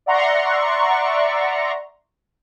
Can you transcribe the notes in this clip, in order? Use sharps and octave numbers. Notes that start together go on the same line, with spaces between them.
D5 E5 F#5 A#5 C6 C#6